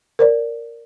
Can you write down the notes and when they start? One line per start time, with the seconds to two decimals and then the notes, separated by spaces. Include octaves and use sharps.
0.19 A#4 C5 D5